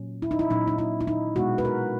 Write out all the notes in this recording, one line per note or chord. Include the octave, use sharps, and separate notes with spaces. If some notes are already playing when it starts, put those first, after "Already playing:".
Already playing: A#2 F#3 C#4
E4
D#4
E4
A#2 F#3 C#4 D#4
D#4
E4
E4
D#4
B2 G#3 B3 F#4
B4
A#4